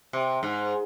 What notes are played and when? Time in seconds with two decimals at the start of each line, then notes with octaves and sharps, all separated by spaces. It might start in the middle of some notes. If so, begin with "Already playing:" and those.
0.13 C3
0.43 G#2